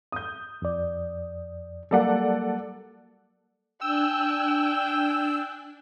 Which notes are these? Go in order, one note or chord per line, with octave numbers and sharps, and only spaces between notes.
D#6 G6
F2 D5
F#3 G3 A#3 A4 D5 F#5
D4 G5 G#5 E6 F#6